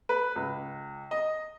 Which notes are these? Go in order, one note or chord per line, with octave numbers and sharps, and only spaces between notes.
B4
C#2
D#5